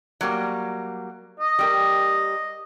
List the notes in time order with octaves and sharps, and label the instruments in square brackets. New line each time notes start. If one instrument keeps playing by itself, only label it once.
[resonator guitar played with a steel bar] F#3 G3 A#3
[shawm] D#5
[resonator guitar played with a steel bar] G3 G4 A#4